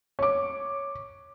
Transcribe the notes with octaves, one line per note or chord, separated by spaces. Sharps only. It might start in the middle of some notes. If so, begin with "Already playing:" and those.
C#5 D6